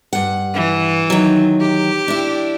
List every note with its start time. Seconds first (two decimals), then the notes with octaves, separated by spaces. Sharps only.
0.13 G2 F#5
0.54 E3
1.10 D#3 F#3
1.61 G4
2.08 D4 E4